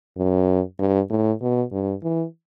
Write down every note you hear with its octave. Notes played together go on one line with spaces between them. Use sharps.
F#2
G2
A2
B2
G2
E3